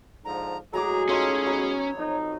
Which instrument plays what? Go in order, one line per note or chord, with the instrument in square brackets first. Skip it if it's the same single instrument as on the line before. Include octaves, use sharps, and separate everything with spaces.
[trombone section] G#2 D3 F3 [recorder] A#5
[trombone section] A2 G#3 G#4 [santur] F#3 F#4 D6 [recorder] A#5
[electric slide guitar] C#4 [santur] D#4 F4 A4 [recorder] C#5
[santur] F#3 B3 A#5
[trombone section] F2 D#4